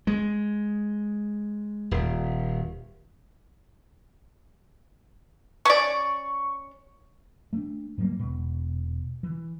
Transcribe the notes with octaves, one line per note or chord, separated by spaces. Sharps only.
G#3
D#1
C#4 D5 C#6
A3 B3 D4
G#2 F#3 G3 A#3
E1 B2
E3